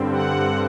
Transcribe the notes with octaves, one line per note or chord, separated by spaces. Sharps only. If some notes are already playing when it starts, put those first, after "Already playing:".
Already playing: G2 D3 G3 C4
F#5